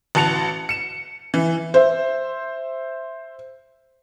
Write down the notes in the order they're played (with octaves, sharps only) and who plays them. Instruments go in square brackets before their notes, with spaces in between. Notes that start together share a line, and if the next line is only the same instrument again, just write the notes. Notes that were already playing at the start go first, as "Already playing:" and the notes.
[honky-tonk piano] A1 F#4 A5 C#7 F7
C#7 E7
E3
[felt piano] C5 E5